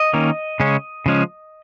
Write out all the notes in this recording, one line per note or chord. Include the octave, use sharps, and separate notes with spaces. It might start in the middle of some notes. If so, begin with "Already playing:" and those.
Already playing: D#5
D#3 A#3 C#4
C#3 G#3 C#4
C#3 F3 G#3 C#4